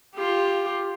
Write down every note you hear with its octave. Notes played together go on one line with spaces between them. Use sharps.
F4 G4